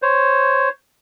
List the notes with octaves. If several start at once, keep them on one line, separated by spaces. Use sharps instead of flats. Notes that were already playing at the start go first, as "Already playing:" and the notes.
C5 C#5